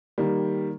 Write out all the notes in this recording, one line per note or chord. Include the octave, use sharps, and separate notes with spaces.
D#3 G3 A#3